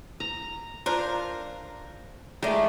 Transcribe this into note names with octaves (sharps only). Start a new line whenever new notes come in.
A#5
D4 F4 A#4 C5
D#3 G#3 A3 D5